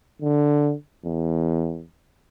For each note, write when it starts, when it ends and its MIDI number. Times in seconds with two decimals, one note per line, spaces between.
0.22 0.73 50
1.05 1.84 40